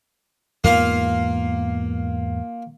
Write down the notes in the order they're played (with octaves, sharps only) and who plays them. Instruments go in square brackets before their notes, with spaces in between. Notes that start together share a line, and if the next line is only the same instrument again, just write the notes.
[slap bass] E2 G#2 B3 [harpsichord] A#3 F4 F5